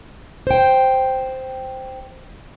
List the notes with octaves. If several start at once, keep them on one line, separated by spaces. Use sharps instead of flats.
C5 G5